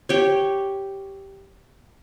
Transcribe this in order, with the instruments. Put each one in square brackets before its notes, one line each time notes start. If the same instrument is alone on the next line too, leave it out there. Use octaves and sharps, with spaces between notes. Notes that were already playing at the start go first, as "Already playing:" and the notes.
[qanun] G4 C#5